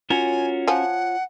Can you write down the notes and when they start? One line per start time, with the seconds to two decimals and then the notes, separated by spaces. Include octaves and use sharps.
0.10 C#4 F4 F#4 A#4 C#5 G#5
0.68 F3 F#5 G#5